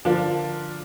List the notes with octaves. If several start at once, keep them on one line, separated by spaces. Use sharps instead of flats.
D3 F3 A#3 D4 F4